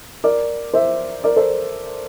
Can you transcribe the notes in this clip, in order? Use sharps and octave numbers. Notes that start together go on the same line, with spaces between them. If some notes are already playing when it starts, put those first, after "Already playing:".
A#4 D5
C5 E5
A#4 D5
A4 C5